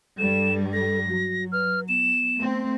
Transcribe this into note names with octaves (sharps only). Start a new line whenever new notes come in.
G2 G3 A4 E7
A4 A#6
F#3 F#4
B4 F6
B3 E7
A3 C4